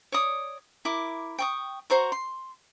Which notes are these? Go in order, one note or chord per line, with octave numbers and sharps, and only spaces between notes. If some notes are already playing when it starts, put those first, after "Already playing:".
C#5 D5 D#6
E4 A#4 D6
G5 C#6 D#6
F#4 C5 A#5 C#6
C6